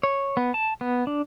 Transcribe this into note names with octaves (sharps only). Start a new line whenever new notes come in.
C#5
B3
A5
B3
D4